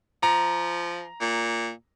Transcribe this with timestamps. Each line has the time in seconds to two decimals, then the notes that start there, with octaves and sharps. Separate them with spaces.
0.23 F3 A#5
1.21 A#2